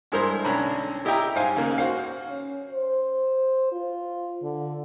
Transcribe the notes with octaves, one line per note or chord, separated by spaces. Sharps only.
G2 G#3 E4 A#4 C5 C6
B1 D3 C#4 D4 A#5 B5
E4 G4 D#5 E5 G5 A#5
G#2 C5 F5 G#5
D#2 C#3 A#3
F#4 C5 F5
C#4
C5
F4
D3